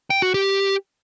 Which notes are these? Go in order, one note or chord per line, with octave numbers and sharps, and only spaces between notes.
G5
F#4
G4